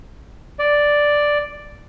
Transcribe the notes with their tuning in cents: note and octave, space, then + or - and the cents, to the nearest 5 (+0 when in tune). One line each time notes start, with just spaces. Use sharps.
D5 +0